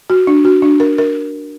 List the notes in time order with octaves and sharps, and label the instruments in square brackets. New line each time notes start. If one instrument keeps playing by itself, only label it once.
[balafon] F#4
D4
F#4
D4
A#4
A#4